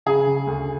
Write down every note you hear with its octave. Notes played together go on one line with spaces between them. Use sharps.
C#3 G#4
C#3
D2